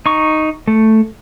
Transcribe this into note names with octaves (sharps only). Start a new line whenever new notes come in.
D#4 C#6
A3